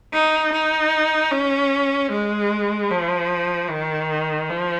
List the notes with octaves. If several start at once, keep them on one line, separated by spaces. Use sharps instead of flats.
D#4
D#4
C#4
G#3
F3
D#3
F3